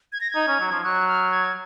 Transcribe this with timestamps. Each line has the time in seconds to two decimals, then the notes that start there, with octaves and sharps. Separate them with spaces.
0.12 G#6
0.21 A#6
0.31 D#4 G#6
0.48 C#4
0.60 F#3
0.71 F3
0.84 F#3 F#6
1.08 F6
1.31 G#6